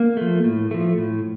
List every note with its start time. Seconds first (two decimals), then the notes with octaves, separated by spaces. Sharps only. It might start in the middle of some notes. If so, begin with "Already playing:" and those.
Already playing: A#3
0.17 F3 A3
0.44 A2
0.71 F3 A3
0.98 A2